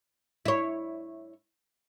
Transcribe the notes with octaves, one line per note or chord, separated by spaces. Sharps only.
E4 C#5